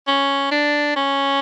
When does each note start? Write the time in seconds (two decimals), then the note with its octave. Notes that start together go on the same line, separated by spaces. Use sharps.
0.07 C#4
0.51 D4
0.96 C#4